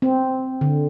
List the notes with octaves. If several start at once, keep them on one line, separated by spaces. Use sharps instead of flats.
C4
D3